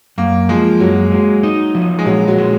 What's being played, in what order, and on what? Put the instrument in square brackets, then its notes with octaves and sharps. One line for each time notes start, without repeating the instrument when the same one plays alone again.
[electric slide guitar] F#2 [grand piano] A#3
[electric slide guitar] F3 [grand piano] G#3
[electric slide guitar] F#2 [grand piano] F#3
[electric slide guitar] G#3
D#4
F3
[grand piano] G#3
[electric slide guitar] A#2 [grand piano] F#3
[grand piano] F#3
[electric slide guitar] G#3